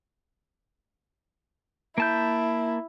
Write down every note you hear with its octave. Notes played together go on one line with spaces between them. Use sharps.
A#3 E4 A5 G6